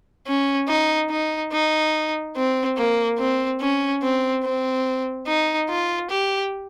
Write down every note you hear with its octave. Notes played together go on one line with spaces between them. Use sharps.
C#4
D#4
D#4
D#4
C4
A#3
C4
C#4
C4
C4
D#4
F4
G4